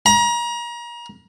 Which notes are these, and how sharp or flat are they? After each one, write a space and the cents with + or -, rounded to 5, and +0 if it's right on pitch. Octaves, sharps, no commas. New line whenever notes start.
A#5 +35